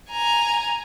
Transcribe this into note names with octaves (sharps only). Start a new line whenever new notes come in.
G#5 A#5